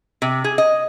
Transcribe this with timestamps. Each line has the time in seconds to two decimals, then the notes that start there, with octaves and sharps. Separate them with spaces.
0.22 C3
0.44 G#4
0.58 D#5